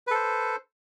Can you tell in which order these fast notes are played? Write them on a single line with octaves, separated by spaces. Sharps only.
B4 A4 C5